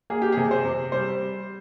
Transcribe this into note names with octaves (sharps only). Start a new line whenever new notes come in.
A#3 G#4
G4
C3 G#4
C5
C3
G3 C5